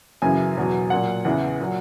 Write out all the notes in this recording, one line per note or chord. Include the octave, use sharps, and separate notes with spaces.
F#2 C#3 E3 G#5
E2 B2 F#3
A#2 F#3 F#5
E2 C#3 E3
A#2 F#3